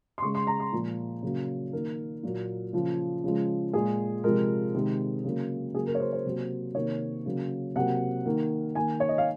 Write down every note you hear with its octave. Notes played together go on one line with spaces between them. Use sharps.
C6
C#3 G#3 C#6
C6
A#5
C6
A#2 F3 G#3
C#3 F#3 A#3
D#3 A#3 A#4
A#2 F#3 A#3
C#3 F3 A#3
C#3 F3 G#3
A#2 G#3 G#4
C3 F3 G#3 A#4
C3 D#3 G#3
C#3 F#3 A#3
C#3 F#3 A#3 G#4
A#4
C#5
C5
C5
C3 F#3 A#3
C3 D#3 A#3 C#5
C#3 F#3 A#3
C3 F#3 A#3 F#5
D#3 A#3
D#3 A#3 G#5
C#5
D#5
F5